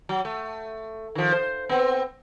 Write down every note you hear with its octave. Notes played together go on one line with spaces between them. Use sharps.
F#3
A3
D#3 F3
C5
B3 C4